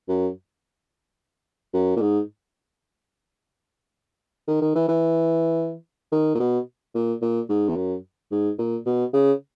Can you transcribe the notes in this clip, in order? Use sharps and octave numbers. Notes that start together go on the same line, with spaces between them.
F#2
F#2
A#2
G#2
D#3
D#3
E3
E3
D#3
A#2
B2
A#2
A#2
G#2
E2
F#2
G#2
A#2
B2
C#3